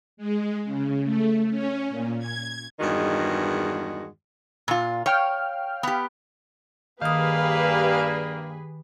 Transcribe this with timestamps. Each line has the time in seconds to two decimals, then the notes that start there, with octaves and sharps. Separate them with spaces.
0.17 G#3
0.64 C#3
1.03 A3
1.50 C#4
1.90 A#2
2.19 G#6
2.80 E2 G2 D#3 G#3 F#4
4.68 A#2 F4
5.06 C#5 F5 G5 F6
5.83 B3 G4
7.02 G2 D#3 A#3 G4 G#4 B4 F5 D#6